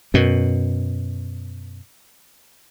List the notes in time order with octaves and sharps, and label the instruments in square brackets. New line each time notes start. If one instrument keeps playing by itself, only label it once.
[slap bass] F#2 B2